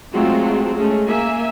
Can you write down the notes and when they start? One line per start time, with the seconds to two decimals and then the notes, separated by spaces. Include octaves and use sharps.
0.13 F#3 G#3 A3 C4 F4 F#4
0.75 G#3 A3 C#4
1.06 A#3 E5 G#5